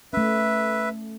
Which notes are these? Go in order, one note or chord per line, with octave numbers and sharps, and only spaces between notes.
A3 C#4 B4 E5